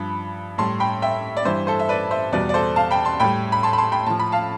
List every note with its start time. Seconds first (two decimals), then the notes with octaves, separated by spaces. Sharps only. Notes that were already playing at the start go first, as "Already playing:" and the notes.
Already playing: G2 F3 B5
0.58 A2 G3 A5 C6
0.80 G5 B5
1.02 E5 G5
1.37 D5
1.45 G2 E3 G3 C5 E5
1.67 A4 C5
1.79 E5
1.89 B4 D5
2.11 C5 E5
2.32 E2 B2 G3 B4 D5
2.49 D5
2.54 A4 C5
2.76 F5 A5
2.91 G5 B5
3.05 A5 C6
3.20 A2 G3 G5 B5
3.52 B5
3.63 A5 C6
3.73 B5
3.78 A5 C6
3.92 G5 B5
4.06 A2 F3 A5
4.19 B5
4.32 F5 A5